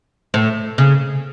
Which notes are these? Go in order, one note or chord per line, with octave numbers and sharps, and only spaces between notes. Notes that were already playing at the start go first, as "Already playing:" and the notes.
A2
C#3